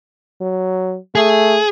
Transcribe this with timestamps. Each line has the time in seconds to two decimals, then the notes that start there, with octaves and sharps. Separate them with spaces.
0.41 F#3
1.15 A3 G#4